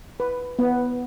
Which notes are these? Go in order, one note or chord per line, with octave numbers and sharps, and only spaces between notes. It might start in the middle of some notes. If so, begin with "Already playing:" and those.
B4
B3